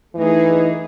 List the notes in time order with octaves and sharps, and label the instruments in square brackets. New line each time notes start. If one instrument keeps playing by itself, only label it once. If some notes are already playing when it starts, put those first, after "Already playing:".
[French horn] E3 [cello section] A3 D#4 G#4